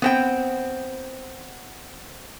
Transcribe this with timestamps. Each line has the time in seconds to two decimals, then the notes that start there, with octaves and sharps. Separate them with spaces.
0.02 B3 C4 G5